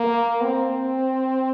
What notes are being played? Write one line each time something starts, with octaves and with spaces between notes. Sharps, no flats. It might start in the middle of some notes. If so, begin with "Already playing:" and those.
Already playing: A#3
C4